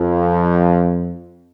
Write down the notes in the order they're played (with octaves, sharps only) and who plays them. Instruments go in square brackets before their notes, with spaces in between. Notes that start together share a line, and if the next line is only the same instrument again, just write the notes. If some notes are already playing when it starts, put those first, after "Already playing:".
Already playing: [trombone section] F2